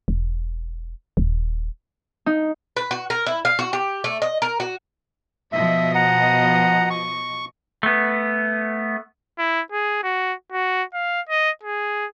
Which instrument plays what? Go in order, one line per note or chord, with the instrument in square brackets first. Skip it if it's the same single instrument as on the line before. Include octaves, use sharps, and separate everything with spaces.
[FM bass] E1
D#1
[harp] D#4
[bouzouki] B4
F#4
A#4
E4
F5
F#4
G4
A3
D#5
A#4
F#4
[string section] B2 F3 D#5 [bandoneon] E5
[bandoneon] F#5 A#5
C#6
[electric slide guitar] A3 B3
[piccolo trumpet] E4
G#4
F#4
F#4
F5
D#5
G#4